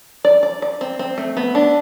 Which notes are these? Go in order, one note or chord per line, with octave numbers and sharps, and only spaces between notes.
D5
D5
D5
C4
C4
A3
B3
D4